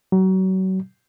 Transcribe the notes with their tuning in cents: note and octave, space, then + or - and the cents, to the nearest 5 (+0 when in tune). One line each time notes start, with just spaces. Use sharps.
F#3 +30